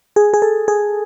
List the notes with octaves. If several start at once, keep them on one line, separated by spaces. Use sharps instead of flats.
G#4
G#4
A4
G#4